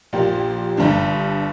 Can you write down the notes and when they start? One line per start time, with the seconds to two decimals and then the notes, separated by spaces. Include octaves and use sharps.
0.13 A#1 A#2 A#3 G4
0.77 G1 G2 G3 D4